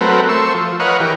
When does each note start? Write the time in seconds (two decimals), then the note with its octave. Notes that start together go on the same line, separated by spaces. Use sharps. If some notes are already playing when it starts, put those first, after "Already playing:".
0.01 F#3 A3 C4 A#4 B4
0.29 A3 C5 C#6 E6
0.54 F3
0.80 A#4 B4 C#5 D#5 F5 F#5
1.00 E3 G4 A#4